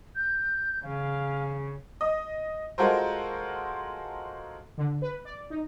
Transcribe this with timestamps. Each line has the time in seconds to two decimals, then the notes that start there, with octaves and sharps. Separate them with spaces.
0.15 G6
0.83 C#3 F5
2.01 D#5
2.78 G#3 F4 F#4 A4 A#4 C5
4.78 D3
5.02 B4
5.25 D5
5.50 D#4